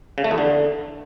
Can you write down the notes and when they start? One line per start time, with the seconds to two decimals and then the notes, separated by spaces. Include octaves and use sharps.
0.18 C#3
0.24 A3
0.31 E2
0.38 D3